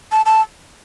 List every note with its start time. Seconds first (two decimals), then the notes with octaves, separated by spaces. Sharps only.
0.12 A5
0.26 A5